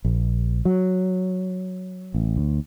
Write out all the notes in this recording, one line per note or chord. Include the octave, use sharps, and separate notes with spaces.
A#1
F#3
A1
D2